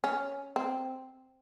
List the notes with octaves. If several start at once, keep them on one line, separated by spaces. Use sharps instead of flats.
C#4
C4